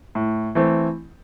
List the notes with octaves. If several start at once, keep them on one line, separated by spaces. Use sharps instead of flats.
A2
E3 A3 C4